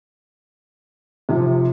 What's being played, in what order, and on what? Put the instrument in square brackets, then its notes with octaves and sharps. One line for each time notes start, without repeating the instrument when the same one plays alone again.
[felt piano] F1 F3 [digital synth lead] C3